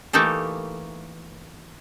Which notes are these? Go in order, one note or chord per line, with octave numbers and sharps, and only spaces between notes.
E3 A3 A#3 D#4 G4 A4